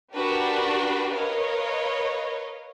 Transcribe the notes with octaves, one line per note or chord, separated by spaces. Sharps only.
D4 F#4 G4 A#4 B4
A#4 B4 C#5 D#5 F5